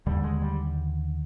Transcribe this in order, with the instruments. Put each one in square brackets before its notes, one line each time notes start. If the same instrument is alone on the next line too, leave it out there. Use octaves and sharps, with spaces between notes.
[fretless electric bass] D#2 D3 G3
G#3
G3